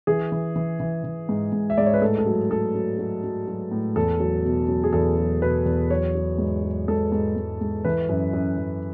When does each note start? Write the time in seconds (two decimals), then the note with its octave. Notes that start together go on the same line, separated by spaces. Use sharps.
0.07 E3 G#4
0.32 E3
0.56 E3
0.80 E3
1.04 E3
1.29 G#2
1.52 G#2
1.70 E5
1.77 G#2 D5
1.86 C#5
1.94 B4
2.01 A2 A4
2.18 A4
2.26 F#3
2.50 F#3 A4
2.75 F#3
2.99 F#3
3.24 F#3
3.47 F#3
3.71 A2
3.96 E2 A4
4.20 F#3
4.45 B2
4.68 F#3
4.84 G#4
4.93 E2 A4
5.18 F#3
5.42 B2 B4
5.65 E2
5.90 F#3 C#5
6.15 F#3
6.38 G#2
6.63 F#3
6.88 G#2 A4
7.12 G#2
7.36 G#2
7.61 G#2
7.85 E3 B4
8.09 F#2
8.33 F#2
8.57 F#2